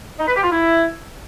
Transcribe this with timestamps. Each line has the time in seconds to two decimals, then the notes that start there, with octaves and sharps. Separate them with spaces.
0.19 D#4
0.27 B4
0.35 G4
0.43 F4
0.50 E4